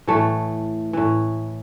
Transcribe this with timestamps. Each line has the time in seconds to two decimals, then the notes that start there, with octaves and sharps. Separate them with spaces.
0.07 A2 E3 A3
0.93 A2 E3